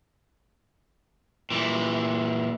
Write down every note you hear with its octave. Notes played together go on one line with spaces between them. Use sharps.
A#2 E3